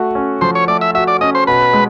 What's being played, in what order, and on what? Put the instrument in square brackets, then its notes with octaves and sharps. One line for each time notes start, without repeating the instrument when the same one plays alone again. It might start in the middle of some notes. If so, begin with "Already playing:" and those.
Already playing: [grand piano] A3 F#4
C#4
[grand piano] F3 [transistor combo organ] C5
[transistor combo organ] C#5
[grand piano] A3 [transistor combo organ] D5
[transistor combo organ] E5
[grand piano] F#4 [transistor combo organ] E5
[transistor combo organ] D5
[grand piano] C#4 [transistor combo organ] D#5
[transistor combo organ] C5
[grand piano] B2 [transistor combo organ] B4
[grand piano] G#3